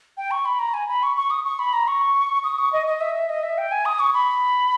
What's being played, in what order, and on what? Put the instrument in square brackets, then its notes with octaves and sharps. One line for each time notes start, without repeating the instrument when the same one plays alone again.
[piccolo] G5
C#6
B5
A#5
G#5
B5
C#6
C#6
D#6
C#6
B5
A#5
C#6
D#6
C#6
D#5
D#5
E5
E5
D#5
E5
G5
G#5
D#6
C#6
B5